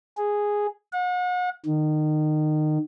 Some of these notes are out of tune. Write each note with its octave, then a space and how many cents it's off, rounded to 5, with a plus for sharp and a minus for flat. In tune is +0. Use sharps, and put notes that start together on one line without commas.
G#4 -5
F#5 -40
D#3 -25